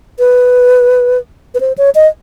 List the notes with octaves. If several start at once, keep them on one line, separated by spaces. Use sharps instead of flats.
B4
B4
C5
C#5
D#5